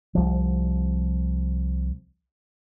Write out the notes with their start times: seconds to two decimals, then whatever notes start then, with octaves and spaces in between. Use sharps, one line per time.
0.15 C2 F3